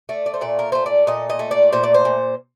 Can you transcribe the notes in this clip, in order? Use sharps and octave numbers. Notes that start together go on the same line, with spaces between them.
A3 D5
D5
C5
A#2 D5
A#4
A3 C5
D5
A#2 D#5
D#5
A3
D5
A#2 C5
D5
C5
A#2